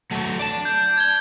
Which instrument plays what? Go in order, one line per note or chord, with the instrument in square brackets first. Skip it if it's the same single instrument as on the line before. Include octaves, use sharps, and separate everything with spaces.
[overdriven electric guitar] F#3 A3
D5 A5
[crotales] G6
G#6 G7